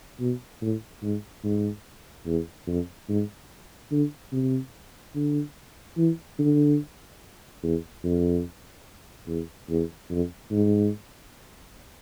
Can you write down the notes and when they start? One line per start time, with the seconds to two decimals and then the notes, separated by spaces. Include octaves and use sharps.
0.20 B2
0.61 A2
1.02 G#2
1.44 G#2
2.26 E2
2.67 F2
3.09 G#2
3.91 D3
4.32 C3
5.15 D3
5.97 E3
6.39 D3
7.63 E2
8.04 F2
9.28 E2
9.69 E2
10.10 F2
10.51 G#2